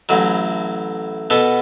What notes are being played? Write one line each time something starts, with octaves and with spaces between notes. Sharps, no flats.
A1 A2 F#3
B2 B3 A4